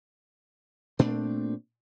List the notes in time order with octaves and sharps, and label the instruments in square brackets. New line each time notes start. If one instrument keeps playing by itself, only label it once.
[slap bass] A#2 A3 C4 D4